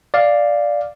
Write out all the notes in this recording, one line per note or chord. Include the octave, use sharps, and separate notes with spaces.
D5 F5